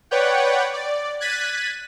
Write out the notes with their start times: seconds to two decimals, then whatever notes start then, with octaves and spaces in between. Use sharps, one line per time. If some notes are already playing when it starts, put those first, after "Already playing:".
0.11 B4 C#5 D5 F#5 G5
0.74 D5
1.20 F#6 G#6 A6 B6 D#7